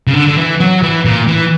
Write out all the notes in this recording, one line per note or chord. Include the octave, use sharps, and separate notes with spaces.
C#3
D3
D3
E3
F#3
E3
A#2
E3